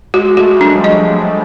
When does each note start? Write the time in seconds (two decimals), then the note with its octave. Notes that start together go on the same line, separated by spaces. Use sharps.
0.14 G#3 F#4
0.25 G#3
0.37 A3 F#4
0.48 G#3
0.56 G3
0.60 F#3 D4
0.76 F3
0.84 D#5